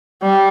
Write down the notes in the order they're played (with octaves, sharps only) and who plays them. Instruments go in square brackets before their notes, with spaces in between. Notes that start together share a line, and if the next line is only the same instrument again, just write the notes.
[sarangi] G3